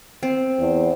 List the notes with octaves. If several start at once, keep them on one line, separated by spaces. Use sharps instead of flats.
C4
E2